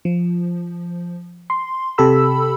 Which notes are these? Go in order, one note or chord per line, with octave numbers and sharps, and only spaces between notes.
F3
C6
C3 G4 A4 B5 E6